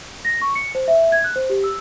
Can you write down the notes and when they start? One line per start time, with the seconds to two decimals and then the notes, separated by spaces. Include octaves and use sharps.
0.25 A#6
0.42 C#6
0.55 C#7
0.75 C5
0.88 E5
1.12 G#6
1.24 F#6
1.36 C5
1.50 G4
1.64 E6